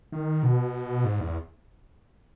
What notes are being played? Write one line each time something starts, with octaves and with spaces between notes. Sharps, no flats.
D#3
B2
G#2
E2